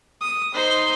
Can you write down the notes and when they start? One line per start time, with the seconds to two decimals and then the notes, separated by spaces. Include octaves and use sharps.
0.21 D#6
0.54 D#4 C5